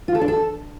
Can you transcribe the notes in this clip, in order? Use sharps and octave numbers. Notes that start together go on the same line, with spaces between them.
F4
A4
D4
A4